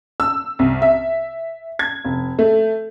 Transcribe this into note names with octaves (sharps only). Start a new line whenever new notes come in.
E6
C2
E5
G#6
F1
A3